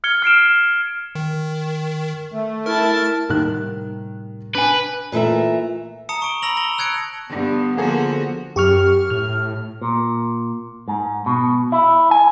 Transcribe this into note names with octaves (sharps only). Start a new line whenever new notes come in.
F6 G#6 C#7 G7
F6 C7 D7 E7
D#3
A3
E4 A#4 A5 F6
A2 C3 D#3 G3 F#6
D4 B4 G#5
A#2 E3 A3 A#4 E5
A5 A#5 D#6 C#7
C#6 D7 G7
A#5 B5 E6 A#6 F7 F#7
A5 E6 A#6 F#7 G7
E6 F#6 G#6 C#7 D7
G2 D3 B3
D3 F3 A#3 B3 F#4 G#4 A4
F#2 G4 C#6 F6
A2 F6
A#2
G#2
B2
E4
G#5